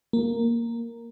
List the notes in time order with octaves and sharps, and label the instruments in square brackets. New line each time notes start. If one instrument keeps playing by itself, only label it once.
[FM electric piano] A#3